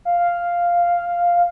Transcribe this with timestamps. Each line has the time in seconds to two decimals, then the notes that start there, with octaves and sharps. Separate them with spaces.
0.05 F5